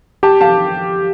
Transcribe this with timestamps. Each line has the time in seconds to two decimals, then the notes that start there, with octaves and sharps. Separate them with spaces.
0.23 G4 A5
0.41 F5 A5